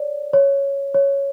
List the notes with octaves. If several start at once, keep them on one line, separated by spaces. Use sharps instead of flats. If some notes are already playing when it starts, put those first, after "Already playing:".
Already playing: C#5 D5
C#5
C#5